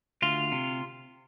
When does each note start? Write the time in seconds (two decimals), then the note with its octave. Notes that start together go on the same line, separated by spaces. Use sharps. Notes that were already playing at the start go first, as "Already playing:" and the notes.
0.22 D2 F4
0.52 C3